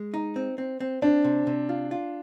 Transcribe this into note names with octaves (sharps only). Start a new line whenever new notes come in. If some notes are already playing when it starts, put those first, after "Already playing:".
Already playing: G#3
D#4
C4
C4
C4
C4 D4
C3
C3
F4
F4